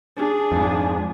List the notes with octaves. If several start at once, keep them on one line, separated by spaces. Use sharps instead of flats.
D4 G#4
F2 G#2